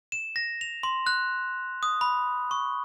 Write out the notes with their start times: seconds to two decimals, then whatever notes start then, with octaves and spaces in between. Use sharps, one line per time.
0.12 E7
0.36 A#6
0.61 F7
0.83 C6
1.06 F#6
1.83 D#6
2.01 B5
2.51 C#6